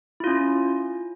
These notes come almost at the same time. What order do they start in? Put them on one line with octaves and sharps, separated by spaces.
E4 F4 C#4